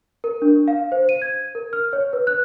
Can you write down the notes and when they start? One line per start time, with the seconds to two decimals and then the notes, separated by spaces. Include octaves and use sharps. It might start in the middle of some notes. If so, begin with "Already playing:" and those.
0.24 A#4
0.42 D4
0.68 F5
0.92 C5
1.09 D#7
1.22 G#6
1.55 A#4
1.73 F6
1.93 C#5
2.13 B4
2.27 F#6